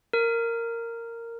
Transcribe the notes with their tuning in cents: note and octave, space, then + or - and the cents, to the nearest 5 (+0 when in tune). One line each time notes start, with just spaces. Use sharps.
A#4 -10